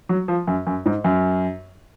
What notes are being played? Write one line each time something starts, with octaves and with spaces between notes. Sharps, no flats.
F#3
F3
F#2
F#2
G#2
F#2